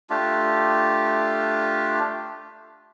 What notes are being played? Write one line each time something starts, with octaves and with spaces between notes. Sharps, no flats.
A3 D4 F4 G4